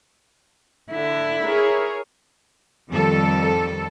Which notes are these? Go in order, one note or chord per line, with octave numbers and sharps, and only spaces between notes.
D3 E4
G#4 A#4 C#5
F2 D#3 G3 A4